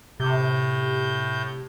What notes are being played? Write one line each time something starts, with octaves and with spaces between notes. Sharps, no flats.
A2 C3 G6